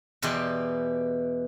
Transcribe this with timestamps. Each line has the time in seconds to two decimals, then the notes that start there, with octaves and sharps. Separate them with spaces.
0.22 E2 B2 E3 G4 D5 C6